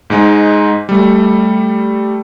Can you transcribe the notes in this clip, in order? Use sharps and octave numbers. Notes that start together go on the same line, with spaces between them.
G#2 G#3 D#4
G3 A3